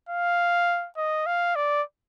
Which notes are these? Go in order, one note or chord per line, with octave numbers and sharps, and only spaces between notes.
F5
D#5
F5
D5